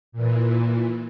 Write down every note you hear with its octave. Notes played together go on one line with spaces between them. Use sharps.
A#2 E3